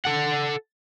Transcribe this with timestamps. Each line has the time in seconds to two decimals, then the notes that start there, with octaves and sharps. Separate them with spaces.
0.05 A4 F#5